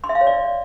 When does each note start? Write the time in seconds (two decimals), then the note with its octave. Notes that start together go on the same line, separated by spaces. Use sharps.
0.04 C6
0.09 E5
0.15 F5
0.21 C#5
0.27 D5